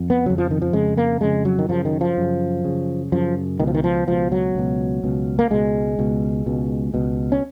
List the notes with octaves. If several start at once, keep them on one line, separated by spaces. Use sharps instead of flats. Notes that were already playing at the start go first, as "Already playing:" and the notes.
Already playing: F2
B3
F2 C#3 F#3
F3
D#3
F3
F2 C#3 G#3
A#3
F2 C#3 G#3
F#3
D#3
F#2 C#3 F3
D#3
F3
F#2 C#3
F#2 C#3
F#2 C#3 F3
C#2 B2 D#3
F3
D#3
F3
C#2 B2 F3
F#3
C#2 B2
C#2 B2
A#3
C#2 B2 G#3
C#2 B2
C#2 B2
C#2 B2
C#4